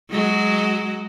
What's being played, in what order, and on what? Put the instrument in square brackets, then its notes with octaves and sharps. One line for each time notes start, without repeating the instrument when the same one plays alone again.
[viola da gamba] F#3 G#3 F#4